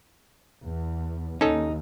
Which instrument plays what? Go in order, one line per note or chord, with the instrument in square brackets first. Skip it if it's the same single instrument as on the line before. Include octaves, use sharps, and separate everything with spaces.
[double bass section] E2
[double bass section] D#2 [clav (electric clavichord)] C#4 A4 [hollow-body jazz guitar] D#4